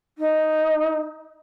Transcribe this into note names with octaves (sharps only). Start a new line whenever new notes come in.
D#4